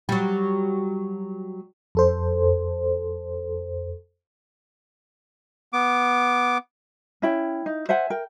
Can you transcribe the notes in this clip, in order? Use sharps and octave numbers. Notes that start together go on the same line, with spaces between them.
F#3 G3
F2 A4 C5
B3 D6
C#4 E4 G5
D#4
C5 E5 F#5 G#5
A#4 G5